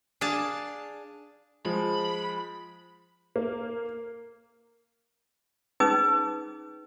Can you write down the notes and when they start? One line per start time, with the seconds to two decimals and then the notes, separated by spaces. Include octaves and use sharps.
0.21 D4 G#4 F5 A5
1.65 F3 G#3 B5
3.36 A#3
5.80 C#4 D#4 G#4 B4 D#6